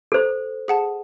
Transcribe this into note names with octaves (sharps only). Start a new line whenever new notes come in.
A4 C5
G#4 F#5 A5